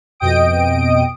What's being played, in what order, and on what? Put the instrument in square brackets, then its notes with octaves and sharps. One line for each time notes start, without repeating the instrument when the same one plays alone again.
[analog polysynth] F2 B2 D#5 G5 D#6 D7